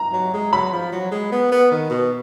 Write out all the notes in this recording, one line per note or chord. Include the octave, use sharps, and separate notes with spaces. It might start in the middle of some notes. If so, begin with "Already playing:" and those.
Already playing: A#5
F#3
G#3
F#3 B5
F3
F#3
G#3
B3
B3
D#3
B2